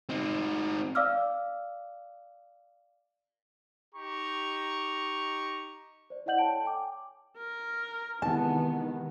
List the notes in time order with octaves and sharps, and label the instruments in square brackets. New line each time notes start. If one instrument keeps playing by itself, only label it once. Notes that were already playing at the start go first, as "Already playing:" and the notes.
[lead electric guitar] C4 D#4
[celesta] D5 F5 D6 E6 F6
[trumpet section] D#4 G4 A#5 C#6
[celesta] C5 D5
E4 D5 D#5 F#5 G6 F#7
A4 C#5 G5 A5 D7
G5 G#5 D6
[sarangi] A#4
[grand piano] C3 E3 G#3 [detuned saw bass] D#3 [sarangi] B3 [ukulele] A5